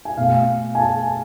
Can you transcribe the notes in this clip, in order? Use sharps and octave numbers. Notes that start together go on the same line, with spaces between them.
G#5
B2 A3 F5
G#5
A5